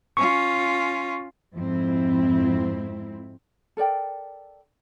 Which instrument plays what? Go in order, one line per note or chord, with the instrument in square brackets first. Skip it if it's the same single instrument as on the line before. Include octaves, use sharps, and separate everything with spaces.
[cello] C#4 F4 [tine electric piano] C#6
[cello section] F2 G#2 C4 E4
[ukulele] A4 A#4 D5 G5